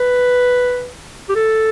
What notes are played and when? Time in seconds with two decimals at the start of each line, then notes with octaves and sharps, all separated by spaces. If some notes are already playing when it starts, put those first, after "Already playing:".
Already playing: B4
1.29 G4
1.35 A4